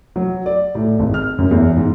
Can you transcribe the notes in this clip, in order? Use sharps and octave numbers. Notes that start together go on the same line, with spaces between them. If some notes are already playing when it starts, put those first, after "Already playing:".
F#3
D5
A2
G#1
F6
F#2
E2
G#2